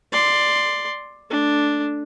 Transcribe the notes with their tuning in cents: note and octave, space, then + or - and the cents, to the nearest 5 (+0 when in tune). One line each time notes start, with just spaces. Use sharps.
D5 +10 C6 +0
A3 +0 D4 +0